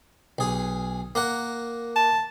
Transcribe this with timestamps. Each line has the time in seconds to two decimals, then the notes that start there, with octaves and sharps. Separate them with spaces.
0.39 B1 G#4
1.15 A#3 A#4 F#5
1.96 A5